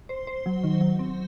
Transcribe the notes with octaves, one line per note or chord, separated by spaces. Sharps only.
C5
C5
F#3
D#3
F#3
C4